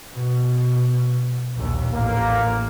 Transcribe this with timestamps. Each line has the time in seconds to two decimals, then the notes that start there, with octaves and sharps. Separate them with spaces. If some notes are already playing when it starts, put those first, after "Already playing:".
0.14 B2
1.56 A#1 D#2
1.93 A1 A#3